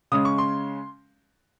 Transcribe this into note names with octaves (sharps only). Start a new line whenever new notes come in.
C#3 G#3 C#4 D#6
C#6
C6